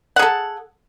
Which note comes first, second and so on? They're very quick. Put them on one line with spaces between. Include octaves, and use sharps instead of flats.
F#5 G#4 A4